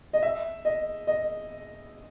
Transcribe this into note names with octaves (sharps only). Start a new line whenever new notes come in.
D#5
E5
D#5
D#5